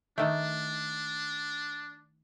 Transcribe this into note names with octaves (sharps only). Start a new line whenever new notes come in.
D#3 A3 D4